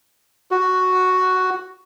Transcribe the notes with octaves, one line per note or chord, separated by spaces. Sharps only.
F#4